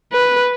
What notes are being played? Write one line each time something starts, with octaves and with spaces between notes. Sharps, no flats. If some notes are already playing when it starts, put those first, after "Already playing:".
B4